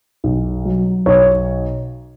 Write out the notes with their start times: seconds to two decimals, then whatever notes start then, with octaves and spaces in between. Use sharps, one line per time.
0.24 B1
0.65 F#3
1.06 B1 C#5